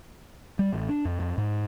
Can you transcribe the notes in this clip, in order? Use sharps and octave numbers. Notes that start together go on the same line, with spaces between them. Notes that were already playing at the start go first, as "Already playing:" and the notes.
G3
A1
D4
F2
F2
G#2